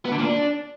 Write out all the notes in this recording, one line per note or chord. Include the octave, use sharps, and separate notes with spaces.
B3
D3
A#2
D4